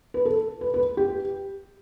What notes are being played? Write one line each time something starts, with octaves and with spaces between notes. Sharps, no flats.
B4
A4
B4
B4
G4